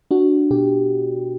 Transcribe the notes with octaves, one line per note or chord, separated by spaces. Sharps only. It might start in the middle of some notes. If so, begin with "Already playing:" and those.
D4 F#4
B2 G4